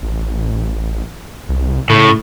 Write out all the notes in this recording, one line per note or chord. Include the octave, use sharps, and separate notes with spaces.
A1
C2
A2 C#3